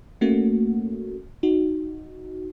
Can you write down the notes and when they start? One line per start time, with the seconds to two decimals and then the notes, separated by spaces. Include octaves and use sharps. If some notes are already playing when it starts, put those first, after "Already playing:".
0.21 A3 A#3 C#4 F#4
1.43 D#4 F#4